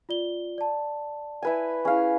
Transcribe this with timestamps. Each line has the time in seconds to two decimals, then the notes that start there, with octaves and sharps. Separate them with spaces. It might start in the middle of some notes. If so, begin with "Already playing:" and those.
0.09 F4 D5 G7
0.58 D5 A5
1.42 E4 B4 G#5
1.85 C#4 E4 G#4 F5